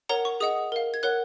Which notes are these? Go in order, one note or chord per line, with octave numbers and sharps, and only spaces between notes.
A#4 C#5 F#5 A#5
C#6
G#4 D#5 F#5 D#6
A#4 F5
G#6
A#4 C#5 F#5 F#6